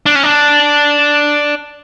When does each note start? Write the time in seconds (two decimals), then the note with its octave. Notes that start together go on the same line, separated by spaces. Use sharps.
0.06 D4
0.15 C#4
0.23 D4